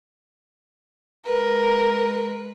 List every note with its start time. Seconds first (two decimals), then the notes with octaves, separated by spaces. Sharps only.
1.27 G#3 A#4 B4